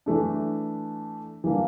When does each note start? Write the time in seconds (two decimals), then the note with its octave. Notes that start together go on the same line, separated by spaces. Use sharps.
0.06 E3 A3 D4
1.44 E3 G3 A#3 D4